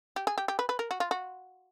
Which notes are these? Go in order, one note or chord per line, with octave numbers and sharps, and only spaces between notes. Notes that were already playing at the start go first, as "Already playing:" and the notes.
G4
G#4
G4
G4
B4
B4
A#4
F#4
F4
F#4